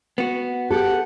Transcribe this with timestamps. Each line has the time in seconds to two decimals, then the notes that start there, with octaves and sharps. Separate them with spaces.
0.18 B3 F#4
0.71 G4 A4 F#5